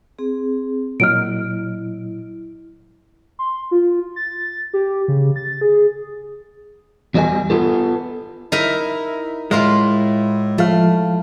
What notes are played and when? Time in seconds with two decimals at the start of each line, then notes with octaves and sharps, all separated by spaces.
0.19 C4 G#4
1.00 A#2 F#3 E4 D#5 F6 D7
3.39 C6
3.71 F4
4.16 A6
4.74 G4
5.08 C#3
5.36 A6
5.61 G#4
7.14 E2 G3 F#4 C5 D#5 G#5
7.50 B3 F4 A4
8.52 D#4 E4 A#4 E5
9.51 A2 G#3 E4 F4 A#4
10.58 F3 A3 F5